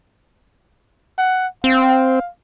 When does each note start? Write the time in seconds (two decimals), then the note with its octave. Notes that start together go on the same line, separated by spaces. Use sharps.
1.18 F#5
1.64 C4 F5